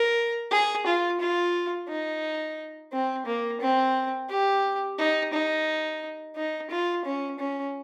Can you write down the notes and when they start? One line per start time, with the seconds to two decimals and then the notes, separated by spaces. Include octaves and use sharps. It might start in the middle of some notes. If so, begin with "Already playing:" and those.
Already playing: A#4
0.51 G#4
0.86 F4
1.20 F4
1.88 D#4
2.92 C4
3.26 A#3
3.60 C4
4.29 G4
4.98 D#4
5.33 D#4
6.36 D#4
6.70 F4
7.05 C#4
7.39 C#4